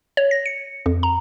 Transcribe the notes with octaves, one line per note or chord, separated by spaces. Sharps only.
C#5
A#6
C#7
F2
A#5